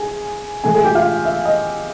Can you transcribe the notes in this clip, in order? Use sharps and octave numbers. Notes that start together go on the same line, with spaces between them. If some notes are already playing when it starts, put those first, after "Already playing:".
Already playing: G#4 G#5
A2 E3 G#3 G#4 G#5
G#4 G#5
G4 G5
F4 F5
E5
D#5